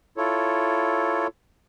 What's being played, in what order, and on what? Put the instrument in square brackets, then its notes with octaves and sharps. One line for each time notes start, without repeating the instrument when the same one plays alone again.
[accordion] E4 F4 A4 C#5